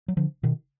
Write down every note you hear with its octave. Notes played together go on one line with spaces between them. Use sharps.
F#3
D3 F3
B2 D#3